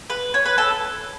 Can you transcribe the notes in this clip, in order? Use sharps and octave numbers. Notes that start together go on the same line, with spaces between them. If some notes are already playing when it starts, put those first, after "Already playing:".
B4
C#5
B4
A4